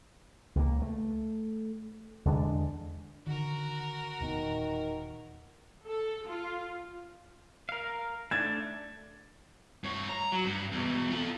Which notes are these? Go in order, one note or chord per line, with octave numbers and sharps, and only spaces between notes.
C#2 A#3
A3
E2 D3 G#3 D4
D3 D#3 F#4 A#4
E1 A#2 D#3 B3
A4
F4
A#4 F5
A3 D4 G#6 A6
G2 C#5
A#5
F#3
G2
E2 B2
F4 A4